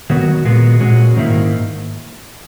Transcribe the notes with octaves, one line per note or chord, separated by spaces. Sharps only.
D#3 F#3 B3 F#4
A#2 G#3 B3 F#4
A#2 G#3 C#4 F#4
G#2 D#3 A#3 E4